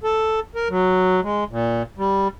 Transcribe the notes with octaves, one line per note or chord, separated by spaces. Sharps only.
A4
A#4
F#3
G#3
A#2
G3